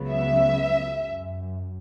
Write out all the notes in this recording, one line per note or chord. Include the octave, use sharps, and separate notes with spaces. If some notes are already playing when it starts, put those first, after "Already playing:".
Already playing: C#2 C#3 F#3 B3
E5
F#2